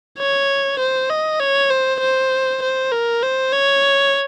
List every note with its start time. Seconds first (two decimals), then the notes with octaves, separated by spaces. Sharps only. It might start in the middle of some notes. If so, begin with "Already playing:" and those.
0.18 C#5
0.79 C5
1.09 D#5
1.40 C#5
1.70 C5
2.00 C5
2.62 C5
2.92 A#4
3.23 C5
3.52 C#5